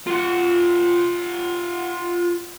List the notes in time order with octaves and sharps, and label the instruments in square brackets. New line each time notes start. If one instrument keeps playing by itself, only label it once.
[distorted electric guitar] F4 F#5